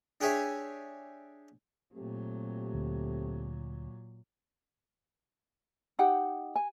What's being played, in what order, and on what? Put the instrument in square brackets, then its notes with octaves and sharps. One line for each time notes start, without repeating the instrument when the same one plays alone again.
[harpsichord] D4 G4 G#4 C#5 E5 G#5
[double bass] A#2 F#3 [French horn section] A3 C4 G4
[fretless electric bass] D2
[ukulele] D#4 G4 F#5 G5
G#5